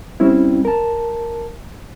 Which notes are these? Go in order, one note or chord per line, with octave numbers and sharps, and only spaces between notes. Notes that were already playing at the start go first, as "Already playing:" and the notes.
G3 C4 C#4 E4
A#4 A5